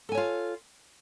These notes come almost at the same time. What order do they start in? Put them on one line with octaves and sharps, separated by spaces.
A4 G#5 C#5 F4